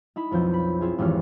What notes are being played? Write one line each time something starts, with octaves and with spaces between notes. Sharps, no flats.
D#4 E4 B5
B1 F2 F3 G6
B5
C4 E4 F4 G#4
G#1 F2 E3 G4 C#5 F6